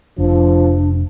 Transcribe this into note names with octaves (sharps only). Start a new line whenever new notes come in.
F1 F3 D4